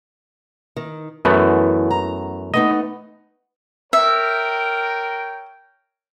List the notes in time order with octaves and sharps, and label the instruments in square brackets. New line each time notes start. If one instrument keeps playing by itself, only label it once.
[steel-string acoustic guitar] D#3
[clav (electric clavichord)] F#2 A3 B3 [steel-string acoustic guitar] E3
[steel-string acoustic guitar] A#5
[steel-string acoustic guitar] A3 B3 D#4 [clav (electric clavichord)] D#5
[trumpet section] A#4 C#5 G5 [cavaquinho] E5